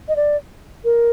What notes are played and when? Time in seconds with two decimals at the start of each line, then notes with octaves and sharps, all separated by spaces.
0.08 D#5
0.16 D5
0.84 A#4